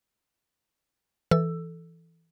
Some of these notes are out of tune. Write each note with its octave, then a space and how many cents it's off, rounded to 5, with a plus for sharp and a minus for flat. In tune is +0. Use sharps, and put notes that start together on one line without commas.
E3 +0 A4 +0 E6 +10